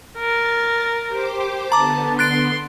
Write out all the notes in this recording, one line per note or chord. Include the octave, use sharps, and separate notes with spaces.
A#4 A6
G4 C5 D6
D3 B3 A5 A#5 D6
C6 F#6 A6 D7